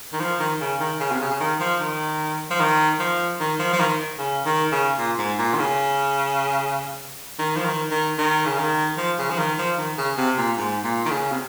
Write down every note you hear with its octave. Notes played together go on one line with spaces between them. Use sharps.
D#3
F3
D#3
C#3
D#3
C#3
C3
C#3
C#3
D#3
F3
D#3
F3
D#3
F3
D#3
F3
F3
D#3
C#3
D#3
C#3
A#2
G#2
A#2
D#3
C#3
D#3
F3
D#3
D#3
D#3
C#3
D#3
F3
C#3
F3
D#3
F3
D#3
C#3
C3
A#2
G#2
A#2
D#3
C#3
C3